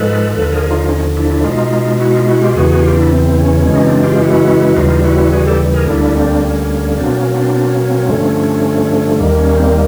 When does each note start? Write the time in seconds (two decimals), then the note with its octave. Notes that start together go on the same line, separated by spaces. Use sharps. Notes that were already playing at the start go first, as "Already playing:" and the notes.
Already playing: G#2 F3 G#3 A4 B4
0.33 D#2 D3 F3 A4 B4
0.48 A4
0.52 G#4 A#4
0.71 D#4 F4
0.89 C#4 D#4
1.16 D4 E4
1.30 D4 E4
1.44 B2 G#3 D#4 F4
2.00 E4 F#4
2.14 D#4 F4
2.27 E4 F#4
2.41 F4 G4
2.55 E2 C#3 E3 F#4 G#4
2.69 F#4 G#4
2.83 F4 G4
2.97 D4 E4
3.10 C4
3.38 C#4
3.66 F#2 C#3 E3 G#3 C#4
3.76 D#4
3.84 C4 D4
4.03 F4 G4
4.22 E4 F#4
4.66 F#4
4.76 D#2 C#3 E3 G3 D#4 F4
5.04 E4 F#4
5.32 F#4 G#4
5.46 G4 A4
5.74 G#4 A#4
5.87 D2 D3 G3 A#3 D4 E4
6.15 C4 D4
6.44 C#4
6.98 B2 F#3 A#3 C4 D4
7.17 C#4
7.31 C#4
7.35 C4 D4
7.54 C4 D4
7.68 C#4
7.82 C#4
7.89 C4
7.96 C#4
8.05 C4
8.09 G2 D3 F3 A3 C#4
9.19 D#2 D#3 G3 A#3
9.39 C#4
9.57 C4